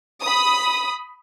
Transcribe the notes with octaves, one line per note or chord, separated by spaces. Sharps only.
B5 D#6